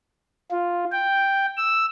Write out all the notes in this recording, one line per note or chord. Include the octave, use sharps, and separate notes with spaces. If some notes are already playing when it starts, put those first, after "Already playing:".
F4
G5
E6